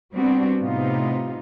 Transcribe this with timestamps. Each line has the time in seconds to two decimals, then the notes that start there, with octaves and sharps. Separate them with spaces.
0.13 G3 B3 C4 D4 F#4
0.59 A2 C3 B3 D#4 F4